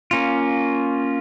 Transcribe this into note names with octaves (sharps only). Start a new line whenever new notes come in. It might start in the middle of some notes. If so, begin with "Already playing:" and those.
A#3 C#4 F4